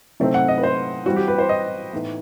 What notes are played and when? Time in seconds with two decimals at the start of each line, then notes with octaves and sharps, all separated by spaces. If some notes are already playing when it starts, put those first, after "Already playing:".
0.20 C3 F#3 A3 C4 D#4
0.34 F#5
0.48 D#5
0.58 B4
0.63 C5
1.06 E3 G3 C4 F#4
1.16 G4
1.28 B4
1.38 C5
1.49 D#5
1.93 A2 E3 B3 D#4